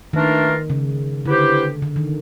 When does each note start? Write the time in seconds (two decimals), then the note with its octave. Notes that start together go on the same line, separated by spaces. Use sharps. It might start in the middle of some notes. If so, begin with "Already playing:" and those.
0.13 D#3 E3 A3 D4 F4 A#4
0.70 C#3
1.25 D3 B3 E4 G4 C5
1.82 D3
1.96 D#3